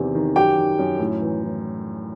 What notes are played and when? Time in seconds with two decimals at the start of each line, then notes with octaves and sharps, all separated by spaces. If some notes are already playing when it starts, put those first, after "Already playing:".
Already playing: E2 C3 D#3
0.15 D#3
0.36 F#2 G4 G5
0.57 D#3
0.78 F#2
0.99 A2
1.21 E3
1.43 E3